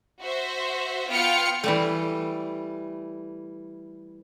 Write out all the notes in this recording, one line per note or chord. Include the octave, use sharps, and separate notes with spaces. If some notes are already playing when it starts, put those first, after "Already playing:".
F#4 C5 E5
B3 F4 F5 G5 F6 C#7
E3 G3 A3